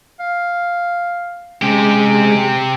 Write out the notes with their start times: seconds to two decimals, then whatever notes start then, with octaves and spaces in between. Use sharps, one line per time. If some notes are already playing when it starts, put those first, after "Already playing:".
0.20 F5
1.62 C3 G#3 C#4 G4